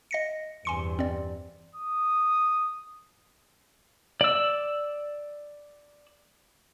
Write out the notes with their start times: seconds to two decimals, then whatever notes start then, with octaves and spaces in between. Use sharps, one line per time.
0.11 D#5 A#6 C#7
0.65 E2 G2 C3 G#5 C6 C#7
0.99 C4 D5
1.75 D#6
4.21 D5 E6